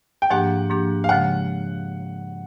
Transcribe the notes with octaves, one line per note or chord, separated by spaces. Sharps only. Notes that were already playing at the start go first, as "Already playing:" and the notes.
G5
G#2 F3 A#3 D4 G4 F#5
G#2 F3 A#3 D4 G4
F5
C#3 F3 G#3 F#5